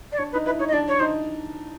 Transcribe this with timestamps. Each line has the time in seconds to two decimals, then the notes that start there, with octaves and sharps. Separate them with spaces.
0.12 D5
0.18 D4 C#5
0.32 D#4 B4
0.46 E4 B4
0.59 D#4 C#5
0.68 D#5
0.73 D4 D5
0.88 C#5
1.00 D#4 C5